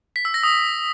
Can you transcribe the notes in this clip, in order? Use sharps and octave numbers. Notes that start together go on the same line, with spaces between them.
B6
E6
A#6
D#6